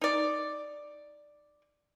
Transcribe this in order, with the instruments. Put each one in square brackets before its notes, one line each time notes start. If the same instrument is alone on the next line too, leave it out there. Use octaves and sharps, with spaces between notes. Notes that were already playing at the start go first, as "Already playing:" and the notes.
[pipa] D#4 D5